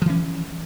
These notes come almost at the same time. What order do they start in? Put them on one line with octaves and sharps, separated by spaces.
F3 E3 C#4